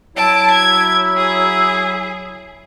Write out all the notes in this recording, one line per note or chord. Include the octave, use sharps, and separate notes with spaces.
F#3 E4 A5 D7
G#6
G#4